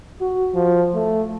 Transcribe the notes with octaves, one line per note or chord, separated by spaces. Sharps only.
F#4
F3
A3